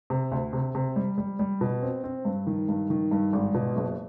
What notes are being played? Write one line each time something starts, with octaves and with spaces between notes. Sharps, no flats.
C3
D2
C3
C3
G3
G3
G3
B2
C4
C4
G2
D#3
G2
D#3
G2
G#1
B2
F#1